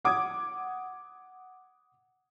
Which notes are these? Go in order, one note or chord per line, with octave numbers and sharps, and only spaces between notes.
F#5 D6 D#6 G#6